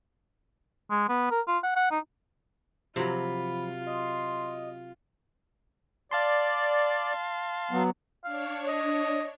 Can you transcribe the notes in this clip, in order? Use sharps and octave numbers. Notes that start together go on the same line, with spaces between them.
G#3
B3
A#4
F4
F#5
F#5
D#4
C3 F3 F#3 F4 B5
D#5 C6
D5 F5 A5 C6
F#3 B3
D4 C#5 F5
D#5